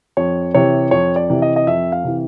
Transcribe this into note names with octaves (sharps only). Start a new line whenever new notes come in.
F2 C#5
C3 E3 C#5
F2 C#5
D5
C3 E3
D#5
D#5
F2 E5
F5
C3 E3